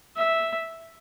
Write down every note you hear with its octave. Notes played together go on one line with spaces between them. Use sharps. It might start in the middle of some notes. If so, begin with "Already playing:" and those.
E5